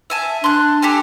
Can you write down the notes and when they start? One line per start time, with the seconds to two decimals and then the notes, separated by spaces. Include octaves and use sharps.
0.10 E5 G#5 A5
0.44 D4 C6 F#6
0.82 G4 A4 G#5